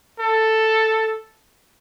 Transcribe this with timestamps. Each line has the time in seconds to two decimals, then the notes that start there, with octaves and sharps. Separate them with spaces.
0.20 A4